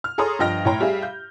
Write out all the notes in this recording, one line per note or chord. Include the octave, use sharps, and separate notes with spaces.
F6
G#4 A4 C#5 A#5 C6 D#6
G2 F3 D#5 G5 F6 A#6
A2 C#5 G5 A#5 C6
G3 G4 G#4 E5 F5
G6